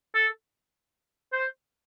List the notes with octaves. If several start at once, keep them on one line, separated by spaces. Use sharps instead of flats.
A4
C5